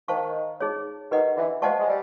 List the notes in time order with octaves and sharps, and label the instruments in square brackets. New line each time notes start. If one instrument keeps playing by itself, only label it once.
[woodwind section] D#3 [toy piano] C5 F5 A5 C#6
[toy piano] D#4 G#4 C#5
[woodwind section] D#3 [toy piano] G4 B4 D#5 F#5
[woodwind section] D3 E3
[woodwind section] F3 G3 [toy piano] C5 D#5 F#5 A5 C#6
[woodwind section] G#3
G3